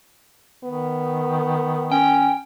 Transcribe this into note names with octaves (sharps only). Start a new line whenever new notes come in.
D#3 B3
C#4 G5